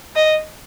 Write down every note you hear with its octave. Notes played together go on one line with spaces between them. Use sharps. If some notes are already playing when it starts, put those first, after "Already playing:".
D#5